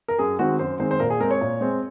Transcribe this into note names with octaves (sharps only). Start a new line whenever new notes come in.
A#4
F#2 G#4
D#3 G#3 C4 F#4
F#2 C5
D#3 G#3 C4 C5
C5
A#2 A#4
G#4
G#3 C4 A#4
C#5
A#2
G#3 C4